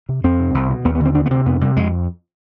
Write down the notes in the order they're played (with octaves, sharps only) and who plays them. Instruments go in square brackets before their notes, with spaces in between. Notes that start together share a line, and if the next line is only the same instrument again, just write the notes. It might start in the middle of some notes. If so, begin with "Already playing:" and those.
[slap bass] C3
F2 C4
C3
C2
B2
D#2 B3
B3
D3
C4
D2 D4
B3
C3 C4
F2 B3
C3 G3
F2 G#3